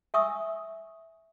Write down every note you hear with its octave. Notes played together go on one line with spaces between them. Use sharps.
E5 G#5 C#6 D#6 E6